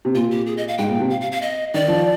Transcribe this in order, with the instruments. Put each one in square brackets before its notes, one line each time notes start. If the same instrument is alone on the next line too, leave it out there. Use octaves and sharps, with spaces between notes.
[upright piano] C3
[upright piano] A#2 [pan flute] F4
[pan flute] G4
G#4
D#5
F5
[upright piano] G#2 [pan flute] G5
[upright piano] A#2
C3
[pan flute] F5
F5
F5
D#5
[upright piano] D#3 [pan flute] D5
[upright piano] F3